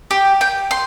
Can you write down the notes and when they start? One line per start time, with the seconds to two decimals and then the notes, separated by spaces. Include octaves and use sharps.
0.11 G4
0.41 G5
0.71 C6